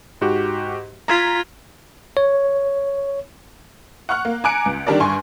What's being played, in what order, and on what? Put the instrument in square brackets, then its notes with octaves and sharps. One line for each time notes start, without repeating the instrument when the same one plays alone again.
[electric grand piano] G#2 F#4 G4
[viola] F4 [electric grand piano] A#5 G#6 B6
[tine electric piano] C#5
[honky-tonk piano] F#5 C#6 F6 F#6
A#3
G#5 A#5 D6 F#6 C#7 D7
C#2
D3 D#3 G3 D4 A#4 D5
G2 G#5 C6 C#6